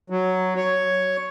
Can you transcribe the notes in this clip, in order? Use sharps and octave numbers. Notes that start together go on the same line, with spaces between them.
F#3
C#5